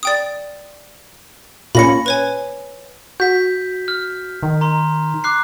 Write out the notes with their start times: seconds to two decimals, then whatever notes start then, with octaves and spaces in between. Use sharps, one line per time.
0.03 D5 G5 D#6
1.75 A#2 A#3 C#4 B5 A#6 C#7
2.06 B4 C#5 G#5
3.20 F#4 G6 B6
3.88 F6
4.43 D#3
4.61 A#5 C6
5.24 D6 F#6 C7